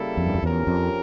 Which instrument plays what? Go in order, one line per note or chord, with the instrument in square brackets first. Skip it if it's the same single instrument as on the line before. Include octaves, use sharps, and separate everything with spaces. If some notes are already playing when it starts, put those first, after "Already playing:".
Already playing: [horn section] C#3 G3 A#3 E4 A4
[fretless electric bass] F2
G2
F2
[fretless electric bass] E2 [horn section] F3 C#4 G4 A#4
[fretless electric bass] F2